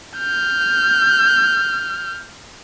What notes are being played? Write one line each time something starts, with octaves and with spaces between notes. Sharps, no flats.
F6 G6